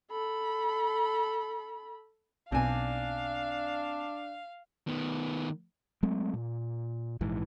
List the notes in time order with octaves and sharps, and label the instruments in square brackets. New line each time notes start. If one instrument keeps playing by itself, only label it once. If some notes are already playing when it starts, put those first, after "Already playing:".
[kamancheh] A4 B5
[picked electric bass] B1 B2 [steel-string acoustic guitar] C4 G#5 [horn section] D4 [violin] F5
[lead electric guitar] D#3 B3
[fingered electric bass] F#3 G#3 A3 C4
A#2
A#1 G#2 E3